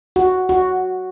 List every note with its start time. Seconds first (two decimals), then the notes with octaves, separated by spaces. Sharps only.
0.16 F#4
0.49 F#4